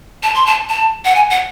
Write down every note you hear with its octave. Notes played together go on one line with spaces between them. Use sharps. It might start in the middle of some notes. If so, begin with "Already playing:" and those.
A5
C6
A5
A5
F#5
G#5
F#5